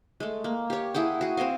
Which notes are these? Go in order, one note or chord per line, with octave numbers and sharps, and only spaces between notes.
G#3 A3
A#3
G4 C#5
E4 G#4 F#5 G5
F#4 G#4
C4 E4 D#5 F5